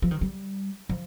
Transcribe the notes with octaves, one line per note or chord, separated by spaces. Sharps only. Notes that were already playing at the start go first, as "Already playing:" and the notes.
F3
D#3
G3
F3